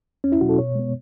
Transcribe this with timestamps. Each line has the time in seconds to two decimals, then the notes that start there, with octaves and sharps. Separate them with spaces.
0.24 E2 C#4
0.32 E4
0.41 B2 F#3 F#4
0.49 A4
0.58 B2 C#5
0.75 G#3 B3